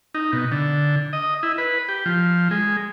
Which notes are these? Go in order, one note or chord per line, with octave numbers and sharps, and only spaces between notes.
D#4
B2
D3
D#5
E4
B4
G4
F3
G#3